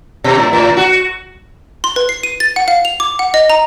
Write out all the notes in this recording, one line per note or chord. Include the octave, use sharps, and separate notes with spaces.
B2
A2
A2
F#4
C6
B4
C7
D#7
A6
F#5
F5
F7
D6
F#5
D#5
A#5